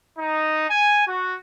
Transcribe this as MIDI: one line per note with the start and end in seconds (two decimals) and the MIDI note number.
0.18 0.67 63
0.69 1.03 80
1.07 1.35 66